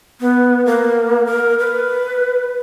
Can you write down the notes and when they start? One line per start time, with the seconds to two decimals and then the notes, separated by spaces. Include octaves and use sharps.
0.21 B3
0.66 A#3
1.26 A#4
1.59 B4